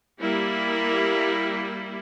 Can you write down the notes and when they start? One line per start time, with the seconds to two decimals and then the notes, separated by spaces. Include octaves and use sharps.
0.19 G3 A#3 E4